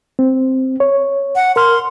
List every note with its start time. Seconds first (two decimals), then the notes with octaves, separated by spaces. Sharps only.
0.19 C4
0.80 C#5
1.36 F#5
1.56 A#4 C6 F6